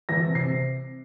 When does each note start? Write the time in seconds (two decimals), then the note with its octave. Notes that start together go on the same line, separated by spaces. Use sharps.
0.09 E3 A#6
0.26 C3
0.35 C7
0.45 C3